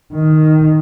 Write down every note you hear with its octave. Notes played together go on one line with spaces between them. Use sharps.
D#3